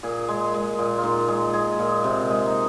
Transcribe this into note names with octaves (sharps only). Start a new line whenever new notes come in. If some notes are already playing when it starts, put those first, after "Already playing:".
A#2 G#4
G#3
G#3
A#2
F4
A#2 D#4
G#3
G#3 G#4
A#2
C3
G#3
D#4